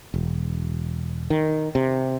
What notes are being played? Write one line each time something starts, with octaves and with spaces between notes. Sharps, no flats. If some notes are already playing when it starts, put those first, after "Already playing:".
E1
D#3
C3